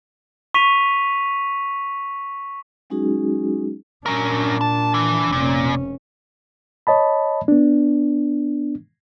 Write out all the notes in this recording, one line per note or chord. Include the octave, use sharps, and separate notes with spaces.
C#6 B6 D#7 F7
F#3 G#3 C#4 D#4 F#4 G#4
A#2 C#4 D4 A#4
A5
E3
F1 A#2 C#4
C#5 D#5 A5 B5
B3 D4